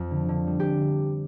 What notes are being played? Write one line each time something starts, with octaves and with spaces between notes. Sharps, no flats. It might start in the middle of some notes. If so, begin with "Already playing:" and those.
Already playing: F2
D3
D3
G3
G4